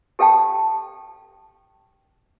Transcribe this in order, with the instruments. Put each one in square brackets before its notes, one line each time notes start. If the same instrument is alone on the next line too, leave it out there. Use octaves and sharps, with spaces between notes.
[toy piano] G4 A4 F5 G5 A5